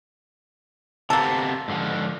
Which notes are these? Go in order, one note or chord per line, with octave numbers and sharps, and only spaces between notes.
C3 A#3 B3 A4
G#2 D3 F3